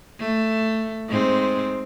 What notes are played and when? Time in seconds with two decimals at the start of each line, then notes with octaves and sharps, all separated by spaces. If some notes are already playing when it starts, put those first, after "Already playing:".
0.19 A3
1.09 G#2 C4